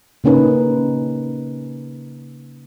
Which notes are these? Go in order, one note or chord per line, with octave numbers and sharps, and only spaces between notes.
C#3 A#3 C#4 D#4 B4